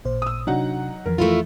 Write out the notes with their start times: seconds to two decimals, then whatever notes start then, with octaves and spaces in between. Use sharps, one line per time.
0.05 A1 A#2 C5
0.22 D#6 E6
0.47 C3 F#3 D4 D#4 F#5
1.06 F2 E3 F3 A#4
1.18 A3 E4 F4